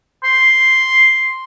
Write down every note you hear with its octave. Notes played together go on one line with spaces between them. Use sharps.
C6